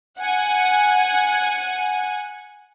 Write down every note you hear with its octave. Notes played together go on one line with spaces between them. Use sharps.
F#5 G#5